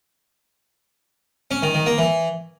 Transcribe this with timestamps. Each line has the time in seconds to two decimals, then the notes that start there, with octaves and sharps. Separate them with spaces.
1.51 C#4
1.63 D#3
1.74 D#3
1.86 A#3
1.98 E3